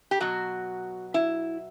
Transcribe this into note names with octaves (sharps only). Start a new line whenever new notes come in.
G4
B2 F#3 F#4
E4